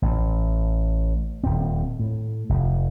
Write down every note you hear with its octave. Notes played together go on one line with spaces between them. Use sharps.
A1
D#1 C4
A2
F1